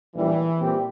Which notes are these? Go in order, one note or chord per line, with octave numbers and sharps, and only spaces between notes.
A#1 A2 E3 G3
A#2 G3 C4 G4